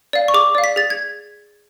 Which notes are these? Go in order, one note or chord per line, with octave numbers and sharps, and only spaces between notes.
D5 F5
C#6
G#4 D6
D5 F5
B6
G#4 A6
G#6